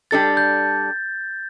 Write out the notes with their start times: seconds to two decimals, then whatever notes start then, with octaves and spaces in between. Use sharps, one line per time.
0.11 G3 D4 A4 A6
0.37 G6